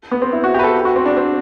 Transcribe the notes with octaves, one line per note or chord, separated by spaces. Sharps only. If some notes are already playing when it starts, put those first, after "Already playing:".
B3
C4
E4
F#4
G4
B4
A4
F#4
C4
D4
C4